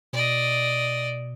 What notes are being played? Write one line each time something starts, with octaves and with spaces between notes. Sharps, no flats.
B2 D5 D#5